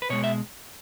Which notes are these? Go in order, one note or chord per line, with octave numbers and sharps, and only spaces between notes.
B4
B2 G#3 C#5
E5